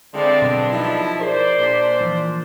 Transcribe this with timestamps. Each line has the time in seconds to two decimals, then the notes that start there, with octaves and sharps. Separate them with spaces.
0.14 D3 F3 G#3 C4 E4 D5
0.42 G2 B2 F#3 D4
0.71 F3 D#4 E4
1.21 G#4 A#4 C5 D5
1.59 A#2 D4 D6 B6
2.01 E3 F3